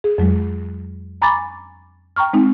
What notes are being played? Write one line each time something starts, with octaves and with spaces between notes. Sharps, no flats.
G#4
F2 F#3 G#3
G#5 A#5 B5 C#6 D6 A6
G5 A#5 C#6 F6
G#3 C4 D#4